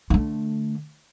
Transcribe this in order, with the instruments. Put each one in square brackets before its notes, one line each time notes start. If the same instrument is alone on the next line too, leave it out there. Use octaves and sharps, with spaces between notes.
[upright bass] D3 A3